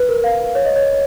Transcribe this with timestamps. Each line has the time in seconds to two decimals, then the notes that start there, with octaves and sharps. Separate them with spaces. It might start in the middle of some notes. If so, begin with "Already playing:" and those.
Already playing: B4
0.09 A#4
0.24 F5
0.55 C#5
0.65 D#5
0.76 C#5